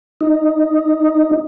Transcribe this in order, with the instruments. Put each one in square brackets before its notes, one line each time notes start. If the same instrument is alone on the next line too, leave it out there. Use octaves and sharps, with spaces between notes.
[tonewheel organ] D#4